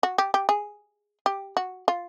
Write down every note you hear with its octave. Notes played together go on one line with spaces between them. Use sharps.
F#4
G4
G4
G#4
G4
F#4
F4